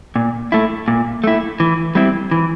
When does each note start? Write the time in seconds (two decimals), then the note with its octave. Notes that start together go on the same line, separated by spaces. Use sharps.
0.16 A#2
0.52 A3 E4
0.88 A#2
1.24 A3 E4
1.60 E3
1.95 G3 C4 E4
2.31 E3